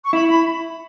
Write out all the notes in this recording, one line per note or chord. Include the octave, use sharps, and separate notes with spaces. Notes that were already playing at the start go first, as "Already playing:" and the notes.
C#6
E4 B5
B5